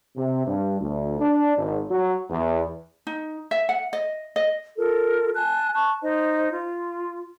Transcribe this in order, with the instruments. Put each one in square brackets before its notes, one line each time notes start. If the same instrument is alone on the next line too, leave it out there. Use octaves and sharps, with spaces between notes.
[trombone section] C3
G2
D2
D4
G#1
F#3
E2
[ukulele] D#4
E5
F#5
D#5
D#5
[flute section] F4 A4 A#4
G#5 A5 F#6
A5 C#6 F#6
D#4 C5 D#5
F4